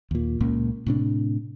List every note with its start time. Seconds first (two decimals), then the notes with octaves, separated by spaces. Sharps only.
0.11 D#2 A#2
0.40 C#2 A#2 C#3 A#3
0.86 A2 C3 D4